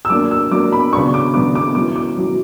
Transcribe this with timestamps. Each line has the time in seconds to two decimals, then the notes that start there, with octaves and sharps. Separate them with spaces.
0.05 E6
0.10 F#3 A#3 D4 D6
0.31 E6
0.51 F#3 A#3 D4 D6
0.72 B5
0.93 C#3 F#3 B3 D4 C#6
1.14 D6
1.34 C#3 F#3 B3 D4 D6
1.55 D6
1.75 B2 F#3 C#4 E4 D6
1.96 D6
2.16 B2 F#3 C#4 E4